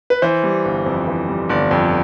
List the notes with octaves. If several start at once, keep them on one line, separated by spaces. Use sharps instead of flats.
B4
E3 C5
G3
G1
F2
E3
G3
G1 D5
F2